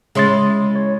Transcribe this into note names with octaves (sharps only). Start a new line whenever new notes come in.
C#3 G#3 C#4 E4 C6 A6
C#5